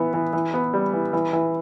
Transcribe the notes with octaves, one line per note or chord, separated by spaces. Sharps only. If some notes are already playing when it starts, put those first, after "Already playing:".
Already playing: E3 B3
E3
E3
B3
G3
E3
E3
E3